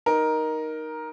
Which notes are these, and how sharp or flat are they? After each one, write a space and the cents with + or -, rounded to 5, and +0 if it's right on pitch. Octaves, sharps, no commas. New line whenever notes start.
D#4 +0 A#4 +10